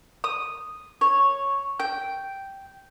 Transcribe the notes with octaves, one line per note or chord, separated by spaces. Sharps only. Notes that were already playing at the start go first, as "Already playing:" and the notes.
D#6
C#5
G5